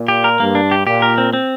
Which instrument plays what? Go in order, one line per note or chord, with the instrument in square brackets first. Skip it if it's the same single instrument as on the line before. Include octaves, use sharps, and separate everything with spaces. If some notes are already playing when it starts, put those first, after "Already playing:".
Already playing: [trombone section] A#2
[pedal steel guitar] G4
A#4
[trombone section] G2 [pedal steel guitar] A#3
[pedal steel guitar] D4
G4
[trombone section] A#2 [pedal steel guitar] G4
[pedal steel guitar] A#4
C4
C4